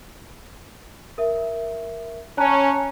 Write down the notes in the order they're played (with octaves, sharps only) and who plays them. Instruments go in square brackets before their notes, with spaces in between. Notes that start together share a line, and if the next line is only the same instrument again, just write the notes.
[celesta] A#4 E5
[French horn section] C#4 [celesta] A5 A#5 F#6